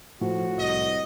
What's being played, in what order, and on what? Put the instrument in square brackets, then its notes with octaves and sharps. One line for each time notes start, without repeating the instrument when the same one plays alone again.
[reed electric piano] A2 [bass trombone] F3 [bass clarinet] F#4
[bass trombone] C2 [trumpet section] D#5